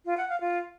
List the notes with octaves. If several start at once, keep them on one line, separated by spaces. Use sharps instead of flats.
F4
F#5
F5
F4